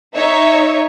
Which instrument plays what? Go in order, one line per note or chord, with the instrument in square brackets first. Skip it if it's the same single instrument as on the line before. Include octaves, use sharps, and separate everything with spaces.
[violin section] D#4 C#5 E5